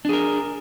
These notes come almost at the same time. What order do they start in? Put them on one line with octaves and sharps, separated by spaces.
D4 G#4 A#4